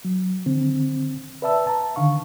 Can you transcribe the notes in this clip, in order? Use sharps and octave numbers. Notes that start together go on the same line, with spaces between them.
F#3
D3 D#3 C4
B4 D5 E5 A5 E6
A5 A#5
D3 D#3 F5 C#6